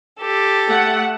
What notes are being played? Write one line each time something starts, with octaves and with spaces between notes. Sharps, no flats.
G4 A4
A3 F#5